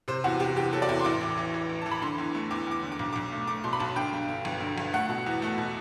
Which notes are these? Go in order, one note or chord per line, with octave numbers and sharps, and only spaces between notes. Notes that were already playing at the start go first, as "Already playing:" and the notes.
C3 C5
E2 F#4
C3 G4
E2 G4
F#3 A4
D5
E2 E5
C6
A1 D6
E3
E3
E3
A1
E3 A5
B5
D3 C6
E2
A3
E2 D6
E2 D6
D3
D6
B1
B1 D6
A3
A3 D6
B2 C6
B5
B1 A5
D3 G5
G2
D3
G1
D3
G1
A3 F#5
B2
E2
A3
B2